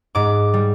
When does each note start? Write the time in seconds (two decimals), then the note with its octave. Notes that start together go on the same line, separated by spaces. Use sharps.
0.15 G#2 D6
0.54 G3